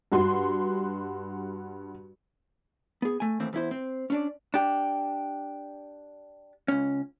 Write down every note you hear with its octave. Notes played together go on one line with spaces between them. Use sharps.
G2 F#4 C6
B3 G#4
A3 G#5
D#2 A2 E3 C4
E2 B3 E4 C5
C4
C#4 D4 D5
D4 G4
C#2 C#4